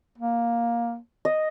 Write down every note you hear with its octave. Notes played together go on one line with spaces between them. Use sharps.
A#3
D#5